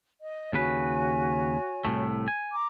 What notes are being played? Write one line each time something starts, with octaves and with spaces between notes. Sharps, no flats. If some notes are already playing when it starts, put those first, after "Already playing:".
D#5
D#2 C#3 F#4 B4 C#5 G#5
C2 A2 A3
G#5
A#5 D6